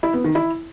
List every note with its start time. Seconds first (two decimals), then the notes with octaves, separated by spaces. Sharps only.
0.03 E4
0.14 B3
0.24 D#3
0.35 E4